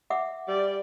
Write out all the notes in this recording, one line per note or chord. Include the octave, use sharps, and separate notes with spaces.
E5 F#5 D6
G3 D5